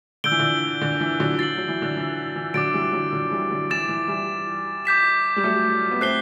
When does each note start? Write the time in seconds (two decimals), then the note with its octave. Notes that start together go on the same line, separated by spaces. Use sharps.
0.24 D3 E6 G6 D7 G7
0.31 E3
0.39 D3
0.81 D3
1.01 E3
1.20 D3 F#3
1.39 A6 C7 F#7
1.57 F#3
1.68 E3
1.82 D3
1.97 E3
2.35 E3
2.54 D3 F#3 D6 A6 D7
2.73 E3 G3
2.93 D3 F#3
3.12 D3 F#3
3.31 E3 G3
3.51 D3 F#3
3.70 E3 D6 A6 E7
3.89 E3
4.08 E3 G3
4.85 D6 G6 B6 E7
5.36 G3
5.43 F#3 A3
5.91 B3
6.01 A3 C4 F#6 C7 G7